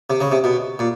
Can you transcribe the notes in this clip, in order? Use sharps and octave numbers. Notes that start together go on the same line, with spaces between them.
C3
C#3
C3
B2
A#2